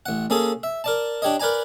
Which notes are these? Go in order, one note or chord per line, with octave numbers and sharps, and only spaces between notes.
A1 F#5
A#3 C#4 G#4 A4 D#6
E5
A#4 D5 A5
D4 G4 C#5 D#5
A#4 B4 D5 G#5 A#5